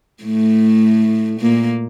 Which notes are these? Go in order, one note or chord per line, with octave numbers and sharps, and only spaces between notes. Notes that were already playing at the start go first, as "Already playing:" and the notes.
A2 A3
A#2 A#3